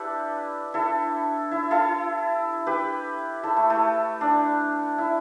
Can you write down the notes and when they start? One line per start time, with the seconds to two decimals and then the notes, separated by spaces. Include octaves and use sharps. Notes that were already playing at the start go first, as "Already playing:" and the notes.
Already playing: D4 E4 G4 A4 B4
0.74 E4 A4
1.51 E4
1.71 E4 A4
2.67 G4 B4
3.43 E4 A4
3.57 A3
3.70 A3
4.21 D4
4.98 E4